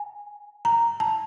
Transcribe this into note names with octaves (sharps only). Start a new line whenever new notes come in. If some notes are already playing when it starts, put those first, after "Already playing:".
Already playing: G#5
A#5
A5